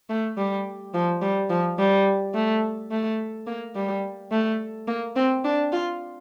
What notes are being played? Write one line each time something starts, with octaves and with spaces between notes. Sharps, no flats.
A3
G3
F3
G3
F3
G3
A3
A3
A#3
G3
A3
A#3
C4
D4
F4